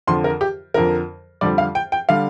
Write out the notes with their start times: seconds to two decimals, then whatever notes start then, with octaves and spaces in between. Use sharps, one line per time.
0.07 F2 D3 F3 C6
0.24 A#4
0.41 G4
0.74 F2 D3 F3 A#4
1.41 F2 D3 G3 D5
1.58 F5
1.75 G5
1.92 G5
2.09 D3 G3 F5